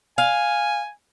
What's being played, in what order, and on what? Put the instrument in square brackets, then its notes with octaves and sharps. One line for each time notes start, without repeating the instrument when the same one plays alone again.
[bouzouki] F5 [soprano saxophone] G#5